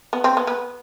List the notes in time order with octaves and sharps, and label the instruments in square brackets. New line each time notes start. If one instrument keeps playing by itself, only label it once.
[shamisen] B3
C4
B3
B3